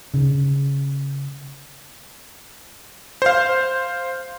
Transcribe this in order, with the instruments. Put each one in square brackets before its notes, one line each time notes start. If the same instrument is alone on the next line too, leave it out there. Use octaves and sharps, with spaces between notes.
[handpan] C#3
[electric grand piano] C5 F5